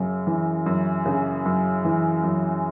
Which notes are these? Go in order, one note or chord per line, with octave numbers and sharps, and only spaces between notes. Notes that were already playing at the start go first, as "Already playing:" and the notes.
Already playing: F#2 C#3
E3
F#2
C#3
F#2
E3
F#2